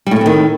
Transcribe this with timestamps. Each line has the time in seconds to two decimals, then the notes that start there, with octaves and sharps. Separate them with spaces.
0.06 G3
0.11 A2
0.16 A3
0.21 C4
0.26 D#3